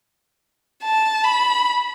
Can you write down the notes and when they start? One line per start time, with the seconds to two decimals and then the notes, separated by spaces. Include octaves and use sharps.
0.83 A5
1.24 B5